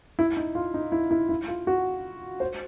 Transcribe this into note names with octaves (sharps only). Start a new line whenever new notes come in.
E4
D#4
F4
D#4
E4
E4
E4
F4
F#4
C5